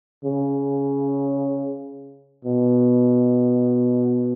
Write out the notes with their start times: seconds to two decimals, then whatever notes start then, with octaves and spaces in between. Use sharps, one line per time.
0.25 C#3
2.45 B2